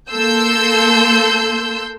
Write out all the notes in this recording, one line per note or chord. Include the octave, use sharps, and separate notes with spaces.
A#3 A4 C6 E6 G6